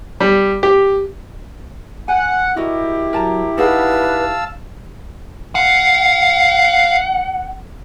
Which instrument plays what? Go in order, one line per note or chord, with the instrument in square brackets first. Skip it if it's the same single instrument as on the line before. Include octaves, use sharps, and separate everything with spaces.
[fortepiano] G3
G4
[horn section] F#5 [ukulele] G#5
[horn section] E4 G4 [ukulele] F#4 A#4 D#5
[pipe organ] F#3 [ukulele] A#4 A5 A#5
[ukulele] D#4 G#4 F#5 [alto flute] B4 [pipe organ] F5 A5 E6
[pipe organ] F5 [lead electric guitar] F#5